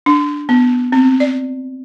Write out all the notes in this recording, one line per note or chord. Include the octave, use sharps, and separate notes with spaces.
D4
B3
C4
D5